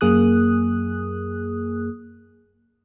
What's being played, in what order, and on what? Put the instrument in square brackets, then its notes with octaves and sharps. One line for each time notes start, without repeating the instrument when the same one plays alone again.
[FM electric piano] F#2 A#3 G#4 D#6 F#6